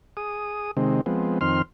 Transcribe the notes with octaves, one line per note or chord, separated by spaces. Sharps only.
G#4 D#6
C3 D#3 G#3 C4
F3 G#3 B3 C4
F2 D#3 C4 C6 F6